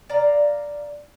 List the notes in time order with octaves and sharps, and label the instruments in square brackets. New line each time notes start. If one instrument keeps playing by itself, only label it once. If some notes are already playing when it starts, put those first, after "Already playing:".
[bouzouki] D5 F5 A#5